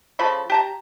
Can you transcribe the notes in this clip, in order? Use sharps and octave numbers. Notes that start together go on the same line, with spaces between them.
C#3 F3 A4 B5
G4 A5 A#5